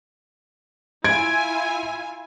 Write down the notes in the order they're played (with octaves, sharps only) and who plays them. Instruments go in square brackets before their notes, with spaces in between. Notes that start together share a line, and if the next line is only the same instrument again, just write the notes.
[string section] E4 F4 G#5 [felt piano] G#6 D7